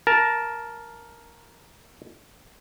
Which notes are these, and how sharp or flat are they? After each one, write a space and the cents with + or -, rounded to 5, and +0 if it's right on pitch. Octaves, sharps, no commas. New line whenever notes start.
A#4 +5 A5 -5